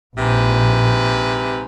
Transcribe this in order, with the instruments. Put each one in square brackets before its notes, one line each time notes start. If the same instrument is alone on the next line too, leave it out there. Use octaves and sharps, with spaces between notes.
[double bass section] A#1 [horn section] G#2 C3 B4